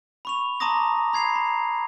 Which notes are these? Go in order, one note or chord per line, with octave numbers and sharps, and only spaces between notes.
B5 C#6 F7
A5 A#5 C6 D6 D#6 A#6
B5 G#6 C7 F7
A#5